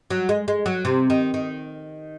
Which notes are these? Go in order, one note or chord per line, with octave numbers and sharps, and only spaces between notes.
F#3
G#3
G#3
F#3
C3
D#3
D#3